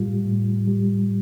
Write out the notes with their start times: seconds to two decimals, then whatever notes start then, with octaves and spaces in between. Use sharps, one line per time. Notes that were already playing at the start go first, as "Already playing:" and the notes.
Already playing: A2 G3 F4
0.25 A2
0.67 G3